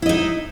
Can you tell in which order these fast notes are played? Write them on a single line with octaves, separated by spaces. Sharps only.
E4 D#5 D#4